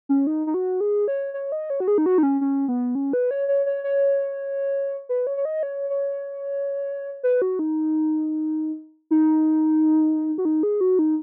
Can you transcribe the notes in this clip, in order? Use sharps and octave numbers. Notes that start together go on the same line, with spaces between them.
C#4
D#4
D#4
F#4
G#4
C#5
C#5
D#5
C#5
F#4
G#4
D#4
F#4
D#4
C#4
C#4
B3
C#4
B4
C#5
C#5
C#5
C#5
B4
C#5
C#5
D#5
C#5
C#5
B4
F#4
D#4
D#4
F#4
D#4
G#4
F#4
D#4